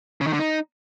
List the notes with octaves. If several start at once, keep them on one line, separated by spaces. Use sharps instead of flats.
C#3
D#3
D3
D#4